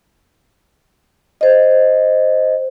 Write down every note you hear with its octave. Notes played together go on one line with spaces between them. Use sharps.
C5 D#5